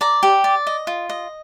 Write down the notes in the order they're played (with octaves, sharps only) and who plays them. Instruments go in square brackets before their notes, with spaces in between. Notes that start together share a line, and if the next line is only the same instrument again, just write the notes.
[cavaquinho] D5 A#5
G4
D5
D#5
F4
D#5